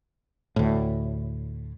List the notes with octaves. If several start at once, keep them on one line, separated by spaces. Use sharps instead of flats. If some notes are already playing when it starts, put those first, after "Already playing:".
D2 A2